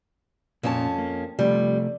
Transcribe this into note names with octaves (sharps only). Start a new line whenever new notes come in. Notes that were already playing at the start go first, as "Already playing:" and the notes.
F2 A#2 C#4 A5
A#3
C3 F3 G3 A3